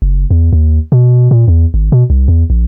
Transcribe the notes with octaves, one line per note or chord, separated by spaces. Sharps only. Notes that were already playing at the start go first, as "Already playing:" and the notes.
F#1
E2
D#2
B2
A#2
E2
G#1
B2
C2
E2
A#1